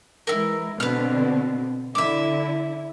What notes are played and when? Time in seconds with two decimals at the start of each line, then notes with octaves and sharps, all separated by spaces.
0.27 E3 G#3 E4 A#4
0.80 B2 D3 C4 B4 F6
1.95 D3 E4 E5 D6